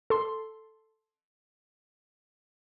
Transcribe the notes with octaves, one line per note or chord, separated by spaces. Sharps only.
A4 C6